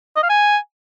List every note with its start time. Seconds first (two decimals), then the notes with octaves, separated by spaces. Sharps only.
0.17 D#5
0.23 F5
0.29 G#5